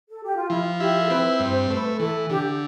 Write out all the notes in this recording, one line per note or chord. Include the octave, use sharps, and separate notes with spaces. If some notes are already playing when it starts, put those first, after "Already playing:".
A4
G4
F4
F3 E4
E4 G4
A4
C4 B4
G2 C5
A3 B4
E3 A4
D3 G4